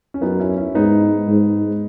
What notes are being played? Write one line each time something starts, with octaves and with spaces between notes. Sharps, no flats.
C#4
F#2 B3 D#4
C#4 E4
C#4 E4
G#2 B3 D#4
G#2